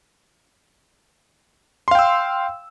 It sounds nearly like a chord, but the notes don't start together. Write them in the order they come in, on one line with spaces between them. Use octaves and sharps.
C6 F5 G5 E6